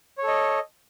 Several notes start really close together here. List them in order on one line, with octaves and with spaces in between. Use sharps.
C#5 A4 D#5